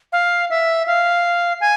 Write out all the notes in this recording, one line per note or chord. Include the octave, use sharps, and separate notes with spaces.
F5
E5
F5
G#5